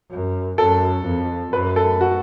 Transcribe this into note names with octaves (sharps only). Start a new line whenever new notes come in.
F#2
F#2 A4
F2
F#2 B4
A4
F#4